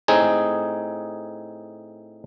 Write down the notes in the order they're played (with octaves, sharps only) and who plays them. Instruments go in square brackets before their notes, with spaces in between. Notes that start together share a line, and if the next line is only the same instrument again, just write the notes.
[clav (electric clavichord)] A2 C4 D#4 G#4